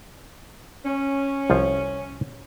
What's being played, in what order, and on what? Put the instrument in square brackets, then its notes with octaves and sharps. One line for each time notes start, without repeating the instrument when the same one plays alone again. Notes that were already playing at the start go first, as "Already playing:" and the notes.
[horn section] C#4
[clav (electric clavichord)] C2 F3 F4